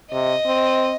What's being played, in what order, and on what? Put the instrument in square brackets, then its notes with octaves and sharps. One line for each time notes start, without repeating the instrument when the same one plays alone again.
[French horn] C3 [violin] D#5
[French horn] C4